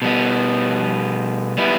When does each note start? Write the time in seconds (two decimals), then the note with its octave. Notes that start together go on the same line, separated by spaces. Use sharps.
0.02 B2 G3 B3
1.58 G3 B3 E4